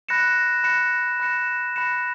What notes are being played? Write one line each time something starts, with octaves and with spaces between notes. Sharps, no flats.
B5 F#6 A#6 C#7 E7
B5 F#6 A#6 C#7 E7
B5 F#6 A#6 C#7 E7
B5 F#6 A#6 C#7 E7